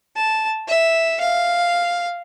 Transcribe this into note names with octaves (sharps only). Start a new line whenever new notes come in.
A5
E5
F5